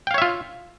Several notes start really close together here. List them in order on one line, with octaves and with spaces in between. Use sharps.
G5 F5 C#5 E5 F4